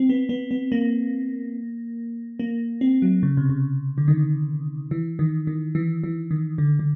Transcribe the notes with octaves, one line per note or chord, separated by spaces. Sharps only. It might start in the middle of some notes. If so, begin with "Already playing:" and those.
Already playing: C4
B3
B3
B3
A#3
A#3
C4
F#3
C#3
C3
C#3
D3
D#3
E3
D#3
D#3
E3
E3
D#3
D3
D3